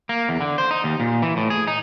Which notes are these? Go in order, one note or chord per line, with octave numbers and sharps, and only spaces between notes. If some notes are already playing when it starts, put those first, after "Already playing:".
A#3
E2
D3
C5
D#4
D#2
A#2
E3
A2
G#4
D#4